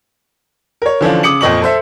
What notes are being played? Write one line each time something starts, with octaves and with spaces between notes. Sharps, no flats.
A#4 C#5
D3 E3 F3 C#4 D4 F4
C#3 D6 D#6 C#7 F#7
F2 A#2 F3 D#5 C#6 F#7
A4 C5 E5